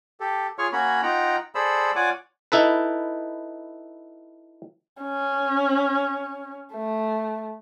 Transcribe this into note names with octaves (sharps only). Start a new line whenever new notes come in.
G4 A4
F4 G#4 C#5 C#6 F6
A#3 C#4 F#4 C#5 B5
D#4 F4 F#5 G5 A#5
G#4 A4 C5 D5 B5 E6
F4 C#5 D5 F#5 G#5 D6
D#4 E4 A4 B4
C#4
A3